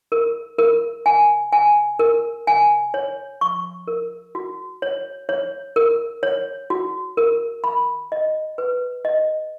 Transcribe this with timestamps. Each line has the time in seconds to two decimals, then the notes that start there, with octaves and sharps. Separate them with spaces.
0.12 A#4
0.59 A#4
1.06 G#5
1.52 G#5
1.99 A#4
2.47 G#5
2.94 C#5
3.41 C#6
3.87 A#4
4.35 F#4
4.82 C#5
5.29 C#5
5.76 A#4
6.23 C#5
6.70 F#4
7.17 A#4
7.64 B5
8.12 D#5
8.58 B4
9.05 D#5